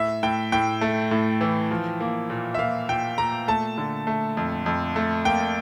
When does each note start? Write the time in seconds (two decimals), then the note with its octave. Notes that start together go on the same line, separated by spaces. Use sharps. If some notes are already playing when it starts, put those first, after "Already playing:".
Already playing: A2 E5
0.23 A2 G5
0.52 A2 G5
0.81 A3
1.11 A2
1.41 E3
1.71 F3
2.00 A#3
2.30 A#2
2.54 E5
2.59 A#2 F5
2.89 A#2 G5
3.18 A#2 A#5
3.48 A3 A5
3.78 D3
4.07 A3
4.37 F2
4.66 F2
4.96 A3
5.25 A#3 G5